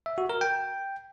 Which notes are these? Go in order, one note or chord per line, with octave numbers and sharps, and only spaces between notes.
E5
F#4
A#4
G5